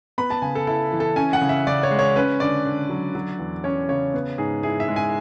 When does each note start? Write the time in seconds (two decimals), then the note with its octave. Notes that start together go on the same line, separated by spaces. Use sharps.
0.18 B3 B5
0.30 A5
0.42 C#3 G#5
0.55 A4
0.67 E4 A4
0.92 E3
1.00 A4
1.16 C#4 G#5
1.33 F#5
1.41 C#3
1.49 E5
1.67 C#3 D5
1.83 C#5
1.91 G#3
1.99 C#5
2.16 C#4 B4
2.40 D3 D5
2.66 D3
2.89 F#3
3.15 F#3
3.39 E2
3.64 C#4 C#5
3.89 C#3 C#5
4.14 B3
4.38 G#2 G#4
4.63 E4 G#4
4.80 E5
4.88 G#3
4.96 G#5